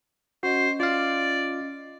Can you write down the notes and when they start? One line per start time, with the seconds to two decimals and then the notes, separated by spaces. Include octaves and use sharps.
0.43 C#4 F#4 C5 D#5
0.80 F4 D5 F5